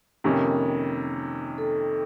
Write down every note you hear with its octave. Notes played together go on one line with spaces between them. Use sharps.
F2 C3 D#3 A#3 C#4
A4